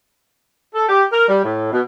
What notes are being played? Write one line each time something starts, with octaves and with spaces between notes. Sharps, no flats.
A4
G4
A#4
G3
A2
B2